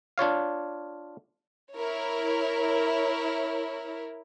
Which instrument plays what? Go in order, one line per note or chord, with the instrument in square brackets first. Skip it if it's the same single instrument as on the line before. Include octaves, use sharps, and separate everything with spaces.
[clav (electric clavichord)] D4 F4 C#5 F5
[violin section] E4 A#4 C#5